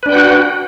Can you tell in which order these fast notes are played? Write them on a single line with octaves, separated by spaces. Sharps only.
B4 D4 G5 F#5 F#4